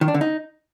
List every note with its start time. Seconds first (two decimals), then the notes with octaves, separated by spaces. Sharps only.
0.01 D#3
0.08 D4
0.14 D3
0.21 D#4